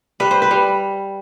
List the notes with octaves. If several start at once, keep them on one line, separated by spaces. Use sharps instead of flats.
G3 B4
C5
B4
G3